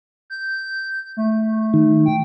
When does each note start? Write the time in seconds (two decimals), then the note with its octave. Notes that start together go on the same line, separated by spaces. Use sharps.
0.30 G6
1.17 A3
1.74 D#3
2.06 G5